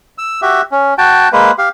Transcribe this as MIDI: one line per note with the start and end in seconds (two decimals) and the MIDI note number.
0.18 0.41 88
0.42 0.61 66
0.42 0.61 67
0.42 0.61 76
0.72 0.94 61
0.98 1.28 66
0.98 1.28 79
0.98 1.28 81
1.33 1.51 56
1.33 1.51 58
1.33 1.51 71
1.58 1.69 67
1.58 1.69 77